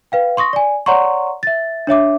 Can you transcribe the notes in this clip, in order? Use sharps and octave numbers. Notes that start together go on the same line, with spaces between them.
B4 F5 G5
C6 C#6 D#6 A#6
D5 G#5
C#5 D5 F#5 A#5 C6 C#6
E5 A6
D4 C#5 E5 D6